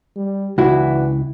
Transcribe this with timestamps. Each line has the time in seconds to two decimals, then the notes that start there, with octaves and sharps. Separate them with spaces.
0.16 G3
0.58 C#2 E3 D4 E4 F#4